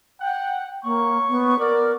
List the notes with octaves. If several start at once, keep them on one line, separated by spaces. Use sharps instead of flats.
F#5 G5
A#3 C#5 C#6
B3
F#4 A#4 D5